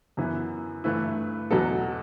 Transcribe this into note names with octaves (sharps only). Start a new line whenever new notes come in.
F#2 E3 B3 E4
G2 E3 A3 E4 B4
E2 B2 F#3 B3 A4